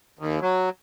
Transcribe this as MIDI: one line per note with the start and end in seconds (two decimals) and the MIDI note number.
0.19 0.39 39
0.42 0.69 54